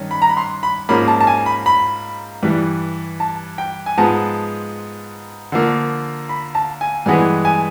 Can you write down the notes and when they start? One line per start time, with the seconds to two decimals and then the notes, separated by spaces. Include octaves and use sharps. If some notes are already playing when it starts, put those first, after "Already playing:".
Already playing: G2 D#3 C#4
0.11 B5
0.22 A#5
0.29 B5
0.37 C6
0.63 B5
0.89 G#2 F3 A#3 C#4 B5
1.08 A5
1.21 A5
1.27 G#5
1.46 B5
1.66 B5
2.43 G2 E3 G3
3.20 A5
3.58 G5
3.86 G#5
3.97 G#2 F3 G#3 B3 A5
5.52 D3 F3 A#3
6.29 B5
6.55 A5
6.81 G#5
7.06 G2 E3 G#3 B3 G#5
7.45 G#5